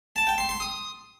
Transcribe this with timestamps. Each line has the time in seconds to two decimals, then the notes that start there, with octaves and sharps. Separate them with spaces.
0.16 A5
0.27 G5
0.38 C6
0.49 C6
0.60 D#6